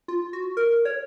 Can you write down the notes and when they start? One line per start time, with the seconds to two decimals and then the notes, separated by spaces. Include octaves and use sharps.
0.08 F4
0.33 F#4
0.57 A#4
0.85 C#5